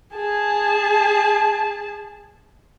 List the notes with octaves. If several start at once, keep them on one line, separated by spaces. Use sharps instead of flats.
G#4 A5